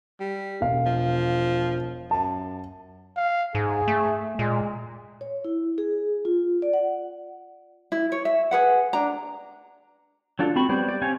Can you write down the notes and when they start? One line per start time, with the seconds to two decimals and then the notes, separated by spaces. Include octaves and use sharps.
0.20 G3
0.61 E1 F5
0.86 F3
2.11 F#2 A5
3.17 F5
3.55 G#2 G#4
3.88 A3
4.39 A#2 G#3
5.21 C#5
5.45 E4
5.78 G#4
6.25 F4
6.62 D5
6.73 F#5
7.92 E4
8.12 C#5
8.25 E5
8.51 G#4 B4 F#5
8.93 D4 A#5
10.39 F#3 D4 F4 A4
10.56 C4 F#4 B5 C#6
10.69 F#3 G3 B3 C5 D5
10.89 D5
11.02 C4 G4 C#5 F5 G#5